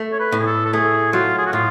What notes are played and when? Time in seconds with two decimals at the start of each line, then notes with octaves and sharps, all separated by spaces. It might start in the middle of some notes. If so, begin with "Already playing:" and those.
Already playing: A3
0.12 C#5
0.19 B4
0.32 A2
0.39 G#4
0.46 A4
0.65 A4
0.73 A3 G#4
1.13 F#3 F4
1.38 G#4
1.46 F#4
1.53 A2 F4